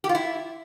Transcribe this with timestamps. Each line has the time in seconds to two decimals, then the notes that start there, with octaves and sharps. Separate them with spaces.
0.04 G4
0.09 F4
0.15 E4